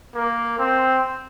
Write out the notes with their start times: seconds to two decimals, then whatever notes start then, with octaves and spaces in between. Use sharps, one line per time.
0.15 A#3
0.58 C4